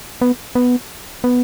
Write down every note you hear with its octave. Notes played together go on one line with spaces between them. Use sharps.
B3
B3
B3